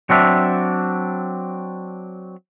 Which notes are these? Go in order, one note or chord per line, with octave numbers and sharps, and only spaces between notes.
F#3 C4 D4 E5